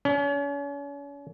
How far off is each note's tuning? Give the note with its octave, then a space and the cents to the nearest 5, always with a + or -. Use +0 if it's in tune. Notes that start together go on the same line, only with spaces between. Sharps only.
C#4 +40